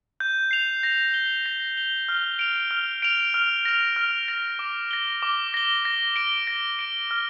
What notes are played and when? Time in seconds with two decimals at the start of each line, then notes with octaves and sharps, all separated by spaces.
0.20 G6
0.51 C7 F7
0.83 A#6
1.14 G7
1.46 A#6
1.77 G7
2.09 F6
2.39 D7 F7
2.71 F6
3.02 D7 F7
3.34 F6
3.65 A#6 F7
3.96 F6
4.28 A#6 F7
4.59 D6
4.91 A#6 G7
5.22 D6
5.54 A#6 G7
5.85 A#6
6.16 D7 G7
6.47 A#6
6.79 D7 G7
7.11 F6